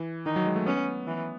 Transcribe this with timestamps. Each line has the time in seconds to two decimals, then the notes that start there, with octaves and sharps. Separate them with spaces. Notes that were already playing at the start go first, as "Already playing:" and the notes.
Already playing: E3
0.26 D#3 D#4
0.36 F#3
0.46 G#3
0.56 A3
0.66 B3 C#4
1.07 E3